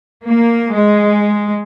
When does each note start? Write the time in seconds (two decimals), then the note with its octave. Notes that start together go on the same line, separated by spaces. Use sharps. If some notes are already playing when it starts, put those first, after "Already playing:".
0.24 A#3
0.72 G#3